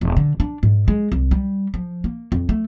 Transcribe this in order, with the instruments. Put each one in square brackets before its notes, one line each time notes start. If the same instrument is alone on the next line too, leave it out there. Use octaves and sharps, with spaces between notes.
[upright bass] E1
D3
D4
G#2
G#3
C2
G3
F3
A#3
F2
A3